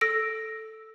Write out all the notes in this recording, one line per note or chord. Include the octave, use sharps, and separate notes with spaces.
A4 E6 A#6 D7